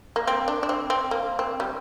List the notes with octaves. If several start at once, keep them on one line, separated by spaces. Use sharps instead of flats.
A#3
C4
D4
D4
C4
C4
A#3
C4
G3